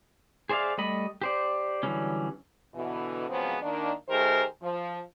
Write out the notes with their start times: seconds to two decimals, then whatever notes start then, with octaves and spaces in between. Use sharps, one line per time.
0.49 G#4 C5 D5 E5 F5
0.78 G3 A3 D#5 B5
1.22 G4 C5 D5
1.83 D3 E3 F#3 G3 C#4
2.75 B2 D3 E3
3.29 C#3 F3 F#3 G#3 B3 C4
3.60 D#3 A#3 D4
4.09 D#3 A3 G4 G#4 A#4 C5
4.62 F3